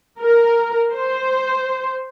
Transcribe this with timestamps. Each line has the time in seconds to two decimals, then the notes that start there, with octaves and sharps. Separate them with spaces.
0.20 A#4
0.93 C5